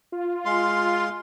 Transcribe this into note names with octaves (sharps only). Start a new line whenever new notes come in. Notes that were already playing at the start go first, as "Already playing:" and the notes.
F4
G#3 F5 C6